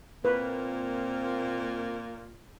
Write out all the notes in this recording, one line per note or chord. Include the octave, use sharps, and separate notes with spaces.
A#2 A#3 C4 F4 B4